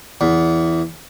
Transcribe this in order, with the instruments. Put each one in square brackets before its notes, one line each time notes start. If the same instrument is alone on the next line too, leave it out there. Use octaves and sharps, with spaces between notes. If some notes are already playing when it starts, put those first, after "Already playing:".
[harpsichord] E2